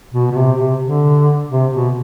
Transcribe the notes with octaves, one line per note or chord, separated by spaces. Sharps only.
B2
B2
C3
C3
D3
C3
B2